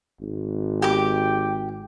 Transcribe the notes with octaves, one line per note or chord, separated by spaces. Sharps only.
G#1
G4 G5 D6